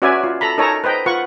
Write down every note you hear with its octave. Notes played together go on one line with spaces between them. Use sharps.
C#4 F#4 B4 D5 E5 G#5
F4
A4 A#5 B5
D#4 A4 A#4 C#5 G#5 A#5
B4 C5 D#5 G5 A#5
F4 B4 F#5 C#6